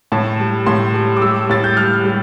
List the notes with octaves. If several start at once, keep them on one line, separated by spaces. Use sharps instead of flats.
A2 A5
G3
A2 C6
G3
D6
G3 E6
A2 A6
G6
G3 F6
G3